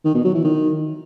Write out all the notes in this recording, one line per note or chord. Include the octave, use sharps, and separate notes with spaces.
D#3
B2
F#3
E3
D#3